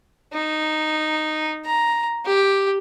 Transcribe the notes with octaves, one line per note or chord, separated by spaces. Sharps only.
D#4
A#5
G4